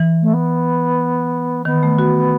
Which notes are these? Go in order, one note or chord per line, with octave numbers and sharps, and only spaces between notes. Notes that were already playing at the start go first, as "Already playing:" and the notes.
Already playing: E3
A3
B3
D#3 B3
A3
F#4